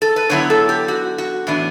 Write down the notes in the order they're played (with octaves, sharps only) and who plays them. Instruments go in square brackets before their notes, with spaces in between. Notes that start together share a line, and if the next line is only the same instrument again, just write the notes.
[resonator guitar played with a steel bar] A4
B4
D3 F#3 B3 E4 C#5
A4
G4
F#4
F#4
A2 E3 B3 D4